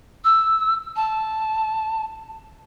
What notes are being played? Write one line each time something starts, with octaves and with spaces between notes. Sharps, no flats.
E6
A5